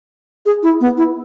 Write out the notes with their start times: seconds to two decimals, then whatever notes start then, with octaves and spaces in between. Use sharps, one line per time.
0.46 G#4
0.63 E4
0.81 B3
0.97 E4